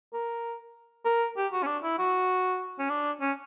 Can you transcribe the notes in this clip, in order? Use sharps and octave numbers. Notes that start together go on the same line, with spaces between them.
A#4
A#4
G4
F#4
C#4
D4
E4
F#4
C#4
D4
C#4